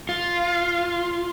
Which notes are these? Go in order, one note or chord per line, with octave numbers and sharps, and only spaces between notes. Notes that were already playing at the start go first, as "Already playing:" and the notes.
F4